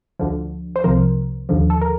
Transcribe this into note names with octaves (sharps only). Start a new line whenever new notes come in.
D2 D3 F3
C5
C2 C3 F3 A#4
D#2 D3 F3
A4
A#4